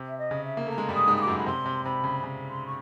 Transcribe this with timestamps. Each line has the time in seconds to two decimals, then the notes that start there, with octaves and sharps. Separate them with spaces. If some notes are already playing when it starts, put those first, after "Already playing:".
Already playing: C3
0.08 E5
0.18 D#5
0.31 C#3
0.44 E5
0.57 A#3
0.67 A3 A#5
0.78 G#3
0.88 G2 G3
0.95 D#6
1.08 G#2 G#3
1.17 D#6
1.21 D6
1.27 F#2 F#3
1.38 B5
1.46 C3 C6
1.66 C3
1.84 C3 B5
2.04 C#3
2.23 C#3
2.49 C6
2.66 C#6